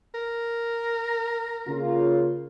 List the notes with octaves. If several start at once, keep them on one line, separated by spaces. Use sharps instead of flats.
A#4
C#3 A#3 F4